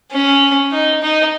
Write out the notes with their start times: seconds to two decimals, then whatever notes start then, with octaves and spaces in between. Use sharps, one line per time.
0.12 C#4
0.72 D#4
1.02 D#4